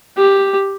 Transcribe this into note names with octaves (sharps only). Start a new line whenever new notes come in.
G4